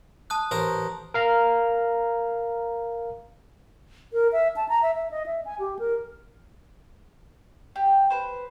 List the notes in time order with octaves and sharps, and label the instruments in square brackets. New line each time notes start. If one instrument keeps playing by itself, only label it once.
[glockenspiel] A5 D#6 F#6
[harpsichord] A1 A#4 C5
[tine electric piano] A#4 F5 A#5
[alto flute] A#4
E5
A5
A#5
E5
E5
D#5
E5
G#5
G4
A#4
[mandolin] G4
B4 C5